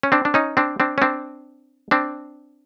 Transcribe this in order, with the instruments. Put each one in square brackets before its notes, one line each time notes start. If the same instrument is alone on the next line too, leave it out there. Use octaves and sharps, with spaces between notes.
[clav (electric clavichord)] C#4
C4 D4
D4
C#4 D#4
C4 D4
C4 D4
C#4
C4 D4
C4 D4